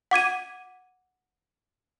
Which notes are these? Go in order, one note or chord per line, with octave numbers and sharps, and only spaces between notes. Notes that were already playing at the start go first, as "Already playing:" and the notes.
F#5 D6 G#6 D#7